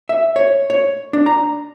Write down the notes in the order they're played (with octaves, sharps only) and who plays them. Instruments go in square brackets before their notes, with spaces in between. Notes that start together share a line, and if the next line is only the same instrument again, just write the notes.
[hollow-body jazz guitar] E5
C#5
C#5
D4
A#5